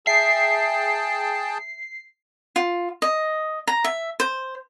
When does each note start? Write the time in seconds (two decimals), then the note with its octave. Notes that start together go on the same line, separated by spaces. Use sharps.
0.07 G#4 E5 G5 A5 C7
2.56 F4
3.02 D#5
3.67 A#5
3.84 E5
4.20 C5